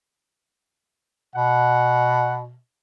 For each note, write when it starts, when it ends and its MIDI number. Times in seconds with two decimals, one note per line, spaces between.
1.36 2.57 47
1.36 2.35 78